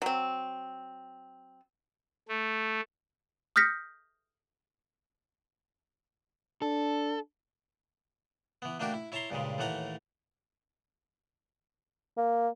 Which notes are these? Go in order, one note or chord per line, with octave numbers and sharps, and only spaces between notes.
F#3 C4
A3
D#6 F6 G6 A#6 B6 C#7
D4 A4
E3 B3
A3 A#3 D4 F#4 G4 A#4
E4
E4 C#5 A5 A#5 C6
G2 A#2 C#3 G#3
D#2 A2 E3 A3 F#5 A#5
A#3